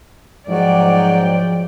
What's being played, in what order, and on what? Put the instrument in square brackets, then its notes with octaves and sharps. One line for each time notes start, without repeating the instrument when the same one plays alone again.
[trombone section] G#2 [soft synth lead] F3 [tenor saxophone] F#3 [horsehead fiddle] D5 G5